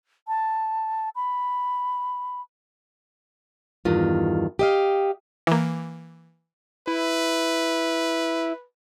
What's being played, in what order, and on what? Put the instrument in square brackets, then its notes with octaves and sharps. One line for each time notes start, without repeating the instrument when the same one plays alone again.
[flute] A5
B5
[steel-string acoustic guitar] E2 G2 D#3 F4
G4 D#5 F5
[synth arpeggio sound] E3 A#3
[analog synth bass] E4 [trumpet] B4